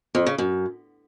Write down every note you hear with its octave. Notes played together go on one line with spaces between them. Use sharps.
F2
C#3
F#2